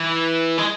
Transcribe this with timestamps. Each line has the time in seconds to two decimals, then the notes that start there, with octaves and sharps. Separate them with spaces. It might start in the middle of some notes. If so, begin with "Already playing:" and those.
Already playing: E3
0.58 G#3